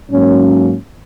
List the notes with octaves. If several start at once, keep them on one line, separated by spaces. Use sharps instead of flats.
G#2 F#3 A#3 C#4